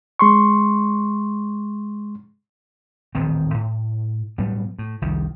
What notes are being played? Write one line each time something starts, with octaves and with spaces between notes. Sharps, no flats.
G#3 C6 C#6
D#1 A1 D#3 C4
A2
A2 F#3 G3 B3
A2
F1 C2 D#3 G3